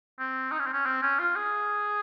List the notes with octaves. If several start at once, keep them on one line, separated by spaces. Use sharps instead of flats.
C4
D#4
C#4
C4
C#4
C4
C#4
F4
G#4